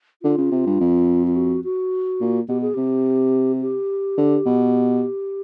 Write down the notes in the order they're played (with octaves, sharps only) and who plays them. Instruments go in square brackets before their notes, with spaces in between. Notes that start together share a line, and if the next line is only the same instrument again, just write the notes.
[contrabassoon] D3 [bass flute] F4
[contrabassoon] C#3
C3
G2
F2
[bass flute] F4
F#4
F#4
[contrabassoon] A#2
[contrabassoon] B2 [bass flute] G4
[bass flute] G#4
[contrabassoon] C3 [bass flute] G4
[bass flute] G4
[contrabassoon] D3
B2